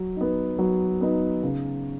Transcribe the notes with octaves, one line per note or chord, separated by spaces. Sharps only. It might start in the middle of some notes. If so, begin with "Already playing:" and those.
Already playing: F#3
B3 D#4
F#3
B3 D#4
C#3